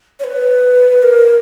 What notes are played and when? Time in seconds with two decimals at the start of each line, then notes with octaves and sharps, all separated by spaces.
0.20 C#5
0.24 B4
1.03 A#4